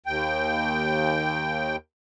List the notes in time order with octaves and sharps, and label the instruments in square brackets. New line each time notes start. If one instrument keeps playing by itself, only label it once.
[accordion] D#2 G5